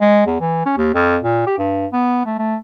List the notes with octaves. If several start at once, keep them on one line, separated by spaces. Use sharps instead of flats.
G#3
E2
E3
C#4
D#2
F2
A#2
G4
G2
B3
A3
A3